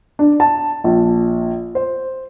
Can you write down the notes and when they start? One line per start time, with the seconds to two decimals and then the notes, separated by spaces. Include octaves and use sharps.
0.19 D4
0.40 A5
0.84 A#1
1.75 C5